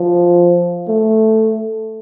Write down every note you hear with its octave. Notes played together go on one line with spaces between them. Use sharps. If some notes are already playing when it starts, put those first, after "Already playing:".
Already playing: F3
A3